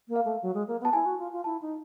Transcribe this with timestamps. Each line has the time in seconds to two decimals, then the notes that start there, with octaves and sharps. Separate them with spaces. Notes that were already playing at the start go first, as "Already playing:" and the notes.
0.08 A#3
0.16 F5
0.24 A3
0.42 F#3
0.54 G#3
0.67 A#3
0.80 B3
0.85 A5
0.93 E4 G#5
1.05 F#4
1.18 F4
1.32 F4
1.44 E4 A5
1.61 D#4